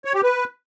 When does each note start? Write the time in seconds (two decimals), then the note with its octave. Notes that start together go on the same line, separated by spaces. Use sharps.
0.05 C#5
0.14 G4
0.23 B4